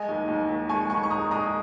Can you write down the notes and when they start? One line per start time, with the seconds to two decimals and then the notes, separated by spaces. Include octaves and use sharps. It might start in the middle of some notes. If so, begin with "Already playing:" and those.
Already playing: G#3 D#5 G#5
0.09 D#2
0.28 D#2
0.49 D#2
0.69 G#3 G#5 C#6
0.90 D#2 G#5 C#6
1.03 C#6
1.11 G#3 A#5 D#6
1.31 G#3 A#5 D#6